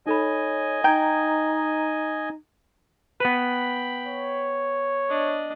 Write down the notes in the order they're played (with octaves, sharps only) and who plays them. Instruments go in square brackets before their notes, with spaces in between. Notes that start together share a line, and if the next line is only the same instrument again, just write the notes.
[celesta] D#4 A4 B5 [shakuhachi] C#5 [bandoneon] D#5 G#5
[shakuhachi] D#4 [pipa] G5 [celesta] A#5 G#6
[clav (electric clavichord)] B3 B4 [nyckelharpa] G5 B5
[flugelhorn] C#5
[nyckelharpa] D4 D#5